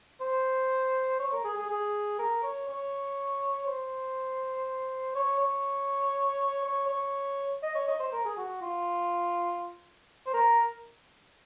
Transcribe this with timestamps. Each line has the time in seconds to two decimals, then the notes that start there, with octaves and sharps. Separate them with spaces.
0.21 C5
1.20 C#5
1.33 A#4
1.45 G#4
1.57 G#4
1.70 G#4
2.19 A#4
2.43 C#5
2.69 C#5
3.67 C5
5.15 C#5
5.40 C#5
6.64 C#5
6.88 C#5
7.63 D#5
7.75 C#5
7.88 D#5
8.00 C5
8.12 A#4
8.25 G#4
8.37 F#4
8.61 F4
10.27 C5
10.34 A#4